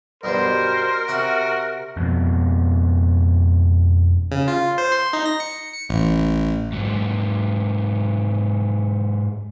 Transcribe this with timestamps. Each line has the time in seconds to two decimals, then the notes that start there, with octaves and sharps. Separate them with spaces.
0.23 G2 B2 G3 A#4 C5
1.08 C3 F#4 F#5
1.97 F2 B2
4.31 C#3
4.48 F4
4.78 C5
4.92 C6
5.13 D#4
5.26 A#6
5.40 C#7
5.73 C#7
5.89 A1
6.20 A1
6.73 G#2 F#3